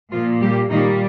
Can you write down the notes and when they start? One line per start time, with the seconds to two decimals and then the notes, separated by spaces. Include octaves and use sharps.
0.11 A#2 F3 A#3 F4
0.40 G3 G4
0.70 A#2 D#3 G3 A#3 D#4